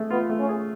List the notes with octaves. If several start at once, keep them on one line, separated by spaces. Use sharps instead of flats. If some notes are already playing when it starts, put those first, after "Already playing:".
Already playing: A3 G#4
B3 F4
A3
C#4
G#4